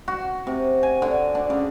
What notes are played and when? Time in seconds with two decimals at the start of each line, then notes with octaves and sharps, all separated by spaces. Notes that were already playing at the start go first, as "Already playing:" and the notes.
0.08 F#4
0.47 C3
0.83 G#5
1.02 D3
1.35 D4
1.50 C#3